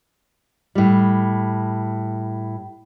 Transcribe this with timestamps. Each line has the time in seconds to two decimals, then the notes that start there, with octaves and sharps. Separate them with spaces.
0.75 A2 G3